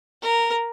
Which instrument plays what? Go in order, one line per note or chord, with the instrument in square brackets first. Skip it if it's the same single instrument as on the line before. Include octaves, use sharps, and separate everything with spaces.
[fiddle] A#4